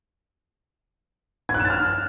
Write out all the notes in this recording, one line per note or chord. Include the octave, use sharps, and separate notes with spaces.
G#6
F#6
E7
A6
F6